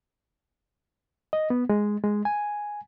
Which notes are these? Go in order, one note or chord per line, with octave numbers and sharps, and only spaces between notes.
D#5
B3
G#3
G#3
G#5